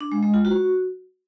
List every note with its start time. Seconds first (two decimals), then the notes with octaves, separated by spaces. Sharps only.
0.01 D4
0.12 G#3
0.23 G#3
0.34 F4
0.45 F#4